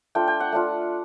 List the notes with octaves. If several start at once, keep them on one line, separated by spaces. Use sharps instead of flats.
A3 D4 F4 G5
G5
F#5
A3 D4 F4